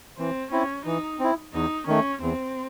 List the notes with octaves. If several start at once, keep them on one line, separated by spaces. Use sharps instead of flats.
E3 C4
C4 C#4 E4
E3 D#4
C4 E4
E2 D#4
D#3 A3 C#4
E2 C4